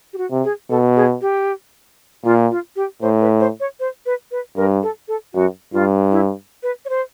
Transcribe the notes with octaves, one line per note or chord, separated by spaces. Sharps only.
G4
F#4
C3
G#4
B2 A4
G#4
G4
A#2 F4
F4
G4
A2 C5
B4
C5
C#5
C5
B4
B4
G2 A#4
A4
A4
F#2 F#4
G2 F4
E4
B4
C#5
C5